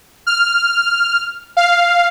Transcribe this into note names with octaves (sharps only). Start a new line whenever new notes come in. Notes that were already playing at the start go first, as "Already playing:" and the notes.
F6
F5